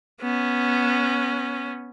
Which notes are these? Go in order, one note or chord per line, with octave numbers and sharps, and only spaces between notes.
B3 C#4